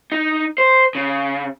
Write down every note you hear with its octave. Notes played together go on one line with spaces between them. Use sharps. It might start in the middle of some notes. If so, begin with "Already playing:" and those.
D#4
C5
C#3